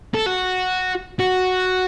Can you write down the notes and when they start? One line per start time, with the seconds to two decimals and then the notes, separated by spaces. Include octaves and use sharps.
0.14 A4
0.26 F#4
1.20 F#4